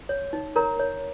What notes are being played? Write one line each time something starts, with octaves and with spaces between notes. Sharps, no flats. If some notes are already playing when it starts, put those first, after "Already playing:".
C#5
D#4
A#4 C#5 A#5
C#5